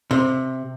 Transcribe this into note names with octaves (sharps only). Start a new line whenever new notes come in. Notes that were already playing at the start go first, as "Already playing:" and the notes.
C3